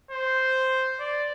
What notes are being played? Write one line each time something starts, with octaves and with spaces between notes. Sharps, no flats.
C5
D5